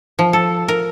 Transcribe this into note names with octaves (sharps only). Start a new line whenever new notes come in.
F3
A4
A#4